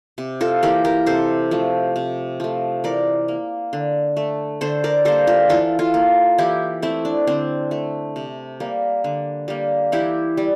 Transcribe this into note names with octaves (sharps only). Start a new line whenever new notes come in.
C3
F4 A4
E3 A#3 G4 A#4
G4 A#4
C3 A4 C5
F3 A3
C3
F3 A3
E3 A#4 D5
A#3
D3
A3
D3 A4 C5
A#4 D5
G3 A#3 A4 C5
F4 A4
E3 F4 A4
F4 A4
A#3
E3 E4 G4
A3 C4 E4
D4
D3 C4
A3
C3
G3 A#3
D3
G3 A#3
E3 E4 G4
G3